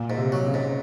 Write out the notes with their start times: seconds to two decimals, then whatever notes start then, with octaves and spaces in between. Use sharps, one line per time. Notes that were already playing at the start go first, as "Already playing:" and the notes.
Already playing: A#2
0.10 G#2
0.17 C3
0.32 F#3
0.46 C#3
0.54 G#2